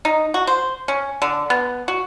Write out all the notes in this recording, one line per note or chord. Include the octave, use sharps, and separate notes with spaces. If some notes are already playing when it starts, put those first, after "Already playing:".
D#4
F#4
C5
C#4
D3
B3
F#4